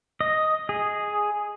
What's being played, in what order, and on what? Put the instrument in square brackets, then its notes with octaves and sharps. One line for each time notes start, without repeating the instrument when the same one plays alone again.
[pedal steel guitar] D#5
G#4